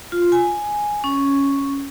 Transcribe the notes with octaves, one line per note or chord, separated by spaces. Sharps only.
F4
G#5
C#4